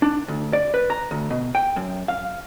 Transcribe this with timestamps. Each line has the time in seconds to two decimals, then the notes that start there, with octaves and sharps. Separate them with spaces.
0.02 D4
0.28 D2
0.53 D5
0.74 B4
0.90 A#5
1.11 D2
1.30 B2
1.55 G5
1.76 F#2
2.08 F5